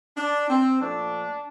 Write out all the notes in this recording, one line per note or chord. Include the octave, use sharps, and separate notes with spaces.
D4
C4
A#2 F3 A3 D4